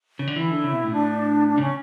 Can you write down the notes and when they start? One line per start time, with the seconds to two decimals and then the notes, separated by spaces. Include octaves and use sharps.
0.19 C#3
0.27 D3
0.36 E3 E4
0.50 D3
0.64 C#3
0.73 B2
0.84 A2
0.92 D4
1.49 D4
1.58 C#3 C#4